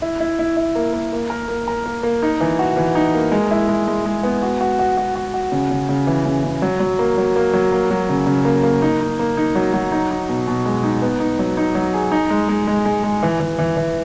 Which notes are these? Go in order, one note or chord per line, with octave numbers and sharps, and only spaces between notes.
E4
E4
E4
E4
A#3
A#3
A#3
A#4
A#3
A#4
A#3
A#3
D#4
E3
F#4
E3
D#4
A#3
G#3
E4
G#3
G#3
G#3
B3
F#4
F#4
F#4
F#4
F#4
F#4
C#3
C#3
C#3
E3
C#3
C#3
F#3
F#3
A#3
F#3
A#3
F#3
A#3
F#3
C#3
C#3
A#3
A#3
D#4
D#4
A#3
D#4
F#3
F#3
D#4
D#4
B2
B2
G#3
D#4
B3
D#4
F#3
D#4
F#3
G#4
D#4
G#3
G#3
G#3
G#3
G#3
E3
E3
E3
E3